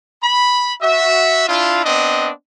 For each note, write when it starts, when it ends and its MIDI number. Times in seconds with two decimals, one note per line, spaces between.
0.23 0.73 83
0.82 1.48 66
0.82 1.48 76
1.48 1.83 62
1.48 1.83 64
1.48 1.83 65
1.85 2.30 59
1.85 2.30 60
1.85 2.30 62
1.85 2.30 75